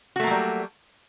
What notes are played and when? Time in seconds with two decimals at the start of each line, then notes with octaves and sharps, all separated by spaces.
0.16 F#4
0.20 A3
0.23 A#3
0.27 F#3
0.31 G3